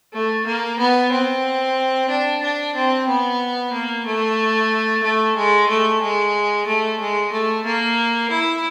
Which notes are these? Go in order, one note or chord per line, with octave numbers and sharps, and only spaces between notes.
A3
A#3
B3
C4
D4
D4
C4
B3
A#3
A3
A3
G#3
A3
G#3
A3
G#3
A3
A#3
E4